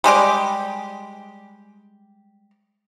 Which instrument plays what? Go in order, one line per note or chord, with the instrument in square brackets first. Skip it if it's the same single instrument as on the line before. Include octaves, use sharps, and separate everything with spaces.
[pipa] G3 G#3 G4 D5